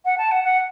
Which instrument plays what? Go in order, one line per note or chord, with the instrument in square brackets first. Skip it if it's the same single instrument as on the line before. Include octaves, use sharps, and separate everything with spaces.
[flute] F#5
A5
F#5
F#5